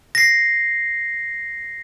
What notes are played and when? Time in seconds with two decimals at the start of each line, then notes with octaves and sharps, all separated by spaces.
0.15 A#6 C7